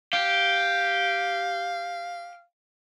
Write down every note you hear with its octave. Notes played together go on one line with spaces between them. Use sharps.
G4 F5